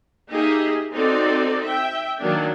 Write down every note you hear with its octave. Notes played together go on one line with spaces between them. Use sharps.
A#3 D#4 G4 G#4 D#5 E5
C4 D#4 F#4 A4 D5
E5 G5
D#3 F#3 A#3 D4